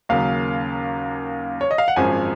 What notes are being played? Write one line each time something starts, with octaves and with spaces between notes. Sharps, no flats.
D#2 C#3 F#3 A#3 F5
C#5
D#5
F5
F#5
G#1 F#2 F3 G#3 G#5